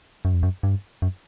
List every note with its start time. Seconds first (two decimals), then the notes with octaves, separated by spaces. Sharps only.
0.25 F#2
0.34 F2
0.43 F#2
0.63 G2
1.02 F#2